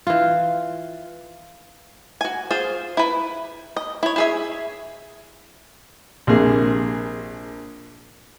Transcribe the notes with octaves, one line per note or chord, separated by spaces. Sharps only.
E3 F4
F#4 G#5
F4 G#4 C5
E4 B4
D#5
E4 C#5
E4 G#4 E5
A#1 C3 A#3 G#4